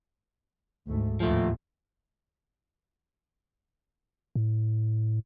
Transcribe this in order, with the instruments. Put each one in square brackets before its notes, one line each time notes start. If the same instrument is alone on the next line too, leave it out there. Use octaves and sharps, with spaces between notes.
[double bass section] D2 G#2 A3
[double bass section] D#2 A2 [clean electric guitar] F3 A3
[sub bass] A2